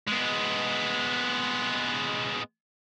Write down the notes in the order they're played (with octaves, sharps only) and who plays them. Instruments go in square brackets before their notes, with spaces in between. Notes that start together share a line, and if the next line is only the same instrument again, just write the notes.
[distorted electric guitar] G#3 B3